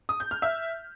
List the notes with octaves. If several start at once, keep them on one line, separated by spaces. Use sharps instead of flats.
D#6
G6
F6
E5